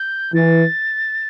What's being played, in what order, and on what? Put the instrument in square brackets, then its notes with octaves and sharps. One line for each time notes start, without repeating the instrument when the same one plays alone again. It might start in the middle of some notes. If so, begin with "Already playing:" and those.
Already playing: [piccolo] G6
[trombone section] E3 [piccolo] A6